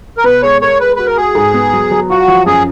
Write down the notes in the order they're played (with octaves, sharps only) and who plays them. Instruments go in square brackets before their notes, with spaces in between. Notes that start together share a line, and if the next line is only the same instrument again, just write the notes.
[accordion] A#4
[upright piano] B2 [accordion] B4
[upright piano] G#3 [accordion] C#5
[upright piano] A#4 [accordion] C#5
[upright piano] G#3 [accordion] B4
[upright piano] F#4 [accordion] B4
[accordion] A#4
[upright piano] F#4 [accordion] G#4
[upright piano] G#2
B3
F#3
F#3
[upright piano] F4 [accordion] F#4
[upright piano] F3
[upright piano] F#2 [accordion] G#4